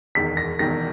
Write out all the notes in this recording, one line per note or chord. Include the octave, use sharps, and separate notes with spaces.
E1 E2 D#3 B6
A#6
E1 E2 D#3 A#6